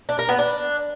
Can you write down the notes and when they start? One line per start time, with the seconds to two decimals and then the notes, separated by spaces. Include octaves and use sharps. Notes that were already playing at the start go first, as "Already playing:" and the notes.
0.09 D4
0.19 A#4
0.29 B3
0.39 D4